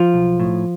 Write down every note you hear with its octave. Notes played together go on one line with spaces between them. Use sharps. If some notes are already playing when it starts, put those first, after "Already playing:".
Already playing: F3 F4
B1
A2